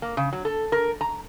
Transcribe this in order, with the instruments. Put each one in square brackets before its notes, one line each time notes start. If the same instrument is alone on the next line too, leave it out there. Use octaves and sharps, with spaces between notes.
[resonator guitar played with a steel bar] A#3
C#3
F#3
A4
A#4
A#5